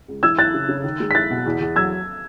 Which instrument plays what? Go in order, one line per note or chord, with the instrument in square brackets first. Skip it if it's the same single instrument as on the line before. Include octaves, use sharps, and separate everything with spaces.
[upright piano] C#2
[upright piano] E3 [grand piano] E6 G#6
[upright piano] E4 [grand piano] F#6 A6
[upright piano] C#3
C#3
D#3
G#3
[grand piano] B6
[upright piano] E4 [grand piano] F#6 A6
[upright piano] B2
E2
E2
[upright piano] F#3 [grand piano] E6 G#6